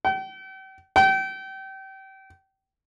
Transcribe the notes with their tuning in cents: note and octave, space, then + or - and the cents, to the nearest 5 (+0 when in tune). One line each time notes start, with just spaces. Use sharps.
G5 -40
G5 -30